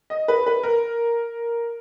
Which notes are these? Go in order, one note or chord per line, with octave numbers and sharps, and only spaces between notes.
D#5
B4
B4
A#4